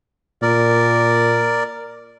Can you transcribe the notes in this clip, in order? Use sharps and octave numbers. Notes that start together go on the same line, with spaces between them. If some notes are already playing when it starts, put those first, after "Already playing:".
A#2 A#4 D5